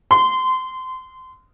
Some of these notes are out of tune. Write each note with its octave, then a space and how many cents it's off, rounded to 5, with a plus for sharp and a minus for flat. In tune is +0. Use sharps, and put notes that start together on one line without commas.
C6 -20